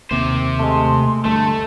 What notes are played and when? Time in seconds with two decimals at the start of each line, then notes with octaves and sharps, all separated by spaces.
0.11 D#2 C3 A#3 C4 C5 D6
0.59 G#3 A3 C6
1.25 D2 G2 A3 A4